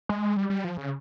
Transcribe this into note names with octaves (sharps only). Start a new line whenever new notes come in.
G#3
G3
G3
F3
C#3